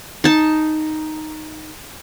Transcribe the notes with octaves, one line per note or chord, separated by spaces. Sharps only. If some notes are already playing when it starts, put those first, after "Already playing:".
D#4 A5